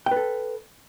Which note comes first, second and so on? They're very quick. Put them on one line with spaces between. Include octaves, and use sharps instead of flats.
G5 B4 A4